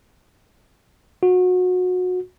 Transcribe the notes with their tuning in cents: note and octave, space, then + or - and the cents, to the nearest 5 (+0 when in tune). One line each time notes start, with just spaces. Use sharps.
F#4 -25